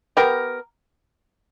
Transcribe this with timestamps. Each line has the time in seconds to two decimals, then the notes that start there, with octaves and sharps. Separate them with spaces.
0.17 B3 G4 A#4